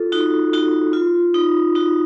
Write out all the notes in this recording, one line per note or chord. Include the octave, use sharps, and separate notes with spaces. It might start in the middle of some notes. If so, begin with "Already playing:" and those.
Already playing: F4 A4
D#4 F#4
D#4 F#4
F4
D#4
D#4 F#4